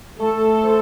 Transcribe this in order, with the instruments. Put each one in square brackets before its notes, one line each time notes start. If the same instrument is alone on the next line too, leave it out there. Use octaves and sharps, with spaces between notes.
[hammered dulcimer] A3 [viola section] A4
[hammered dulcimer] C5